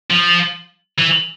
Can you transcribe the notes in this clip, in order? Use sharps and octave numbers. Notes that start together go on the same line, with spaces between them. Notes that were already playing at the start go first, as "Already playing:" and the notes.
F3
E3